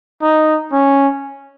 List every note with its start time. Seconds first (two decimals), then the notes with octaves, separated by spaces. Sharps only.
0.22 D#4
0.73 C#4